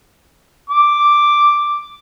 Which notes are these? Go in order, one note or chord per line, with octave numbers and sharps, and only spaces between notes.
D6